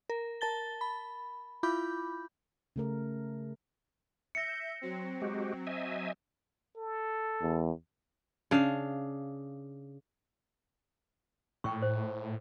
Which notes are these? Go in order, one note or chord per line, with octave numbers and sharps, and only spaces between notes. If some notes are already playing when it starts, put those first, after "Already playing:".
A#4
A#4 A5 A6 G7
B5
E4 F4 B5 D6 G6
C#3 A3 A#4
E5 G6 A#6 C#7
F#3 C4
G#3 F#4 G4
D#5 E5 G#5
A4
E2
C#3 D4 F5
A2 G5 C#6
C5